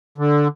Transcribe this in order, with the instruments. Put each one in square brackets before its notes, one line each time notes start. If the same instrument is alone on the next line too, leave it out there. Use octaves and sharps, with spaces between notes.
[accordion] D3